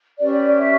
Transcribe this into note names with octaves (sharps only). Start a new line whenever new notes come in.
C#4 G4 B4 D5
E5